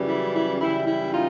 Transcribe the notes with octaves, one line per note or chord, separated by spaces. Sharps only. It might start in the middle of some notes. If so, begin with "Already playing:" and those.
Already playing: F#2 C#3 E3 G3
E4
E4
F#2 C#3 E3 G3 E4
E4
D#4 F4